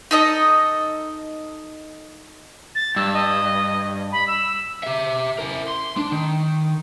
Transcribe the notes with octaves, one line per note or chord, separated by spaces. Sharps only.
D#4 A4 D#5
A6
G2 E6
D#5
B5
E6
G4 E5
E4 A#4
C6
D4
D#3